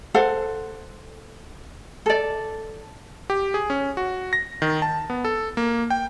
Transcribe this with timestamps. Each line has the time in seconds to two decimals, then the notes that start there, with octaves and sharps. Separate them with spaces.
0.14 A4 C5 F5 F#5
2.06 A4 D5
3.30 G4
3.54 G#4
3.70 C#4
3.97 F#4
4.33 A#6
4.62 D#3
4.82 A5
5.10 B3
5.25 A4
5.57 A#3
5.90 G5